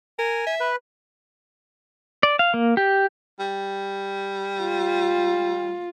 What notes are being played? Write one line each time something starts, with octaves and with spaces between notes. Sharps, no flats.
A#4 G#5
E5
B4
D5
F5
A#3
G4
G3
F4